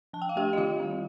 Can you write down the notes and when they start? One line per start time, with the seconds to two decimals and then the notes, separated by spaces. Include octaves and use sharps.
0.13 F3 A5
0.22 G5
0.29 F5
0.36 A3 D4 G4 G5
0.53 D#5
0.57 D#3 F4 F5
0.79 G3 C4